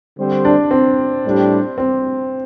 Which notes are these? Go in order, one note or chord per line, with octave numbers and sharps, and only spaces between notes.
D3 G3 C4 G4 C5
D4
C4
A2 G3 D4 G4
C4